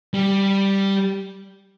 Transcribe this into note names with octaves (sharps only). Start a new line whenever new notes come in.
G3